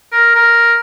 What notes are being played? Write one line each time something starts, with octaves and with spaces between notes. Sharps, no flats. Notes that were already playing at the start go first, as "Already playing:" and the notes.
A#4
A#4